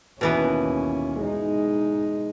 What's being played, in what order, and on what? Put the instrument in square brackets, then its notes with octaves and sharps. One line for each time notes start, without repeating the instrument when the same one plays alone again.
[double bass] D#2 C#4 [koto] B2 E3 B3
[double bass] G#3 D#4